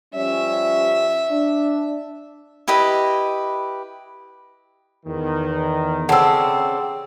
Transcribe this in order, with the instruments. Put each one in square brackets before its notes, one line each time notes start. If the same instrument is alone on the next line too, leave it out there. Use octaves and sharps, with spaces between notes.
[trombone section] F3 G3 C#4 [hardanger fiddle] E5
[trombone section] D4
[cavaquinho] E4 G4 B4 D#5
[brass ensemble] E2 D#3
[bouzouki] C#3 C4 [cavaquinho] A4 D5 [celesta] F#5 E6